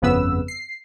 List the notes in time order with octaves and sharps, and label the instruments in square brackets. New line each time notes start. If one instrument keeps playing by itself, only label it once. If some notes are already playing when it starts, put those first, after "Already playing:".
[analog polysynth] G1 F2 C#3 B3 B4 E6
C7